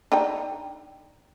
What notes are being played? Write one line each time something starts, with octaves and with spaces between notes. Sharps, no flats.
D4 D#4 G5